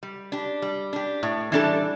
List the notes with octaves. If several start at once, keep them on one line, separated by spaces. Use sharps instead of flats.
G3
D4 G4
G3
D4 G4
A2
E3 G3 D4 A4